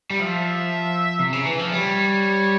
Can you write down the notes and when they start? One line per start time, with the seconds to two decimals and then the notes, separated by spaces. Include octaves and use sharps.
0.10 G3
0.20 F3 E5
1.19 C3
1.33 C#3
1.46 E3
1.59 F3
1.72 G3 C#5